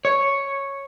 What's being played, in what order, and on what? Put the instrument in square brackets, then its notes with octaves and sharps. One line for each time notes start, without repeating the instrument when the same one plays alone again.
[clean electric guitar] C#5